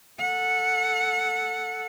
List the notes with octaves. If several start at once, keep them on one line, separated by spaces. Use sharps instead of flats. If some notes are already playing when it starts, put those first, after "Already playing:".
A4 F#5